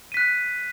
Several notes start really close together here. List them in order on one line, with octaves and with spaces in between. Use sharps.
D#7 B6 F#6